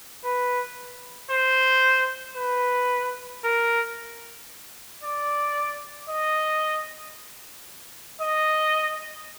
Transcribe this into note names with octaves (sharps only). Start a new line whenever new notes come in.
B4
C5
B4
A#4
D5
D#5
D#5